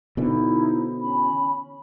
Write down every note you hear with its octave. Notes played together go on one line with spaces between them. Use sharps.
B2 D3 E3 D#4 E4 C5
C#4 B5